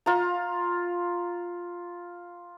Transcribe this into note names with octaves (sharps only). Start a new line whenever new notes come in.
F4 A#5